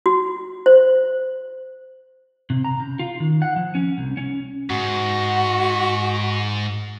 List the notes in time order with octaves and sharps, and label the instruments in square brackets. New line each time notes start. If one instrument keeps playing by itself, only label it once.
[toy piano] F#4
C5
[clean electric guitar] C3
A#5
C#3
F4
D#3
F#5
F3
C#4
C2
C#4
[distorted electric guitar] G#2 [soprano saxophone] F#4